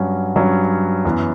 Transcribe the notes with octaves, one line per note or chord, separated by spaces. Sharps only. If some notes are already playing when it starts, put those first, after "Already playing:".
Already playing: G2 F#3 C#4 F#4
G2 F#3 C#4 F#4
F#2 E3 B3